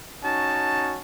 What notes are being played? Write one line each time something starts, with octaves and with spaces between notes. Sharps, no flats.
C#4 D#4 F#4 A5